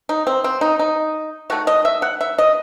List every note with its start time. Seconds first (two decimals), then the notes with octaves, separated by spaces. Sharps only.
0.09 D#4
0.27 C4
0.44 C4
0.61 D#4
0.79 D#4
1.50 D#3 A3 F#4
1.67 D#5
1.85 E5
2.02 F#5
2.21 E5
2.38 D#5